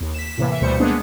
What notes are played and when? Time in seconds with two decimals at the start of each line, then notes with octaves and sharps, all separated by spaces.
0.01 D#2
0.14 B6 E7
0.38 A2 C3 E3 A#3
0.49 E3 E5
0.61 D2 B2 G3 A3 C5 C#7
0.80 G#3 A#3 B3 D4 G#4